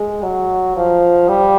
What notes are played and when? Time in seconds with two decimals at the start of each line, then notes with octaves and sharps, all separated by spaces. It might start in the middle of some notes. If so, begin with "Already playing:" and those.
Already playing: G#3
0.23 F#3
0.77 F3
1.29 G3